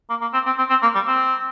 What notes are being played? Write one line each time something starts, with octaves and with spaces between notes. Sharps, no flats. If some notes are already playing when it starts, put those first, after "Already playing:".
A#3
A#3
C4
C4
C4
C4
A#3
G3
C4